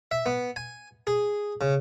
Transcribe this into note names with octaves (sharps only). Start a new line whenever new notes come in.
E5
B3
G#5
G#4
C#3